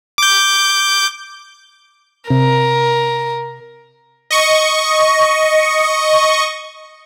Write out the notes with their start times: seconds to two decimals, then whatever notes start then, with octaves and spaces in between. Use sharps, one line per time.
0.18 D6 G6
2.30 C3 A#4
4.31 D#5 C#6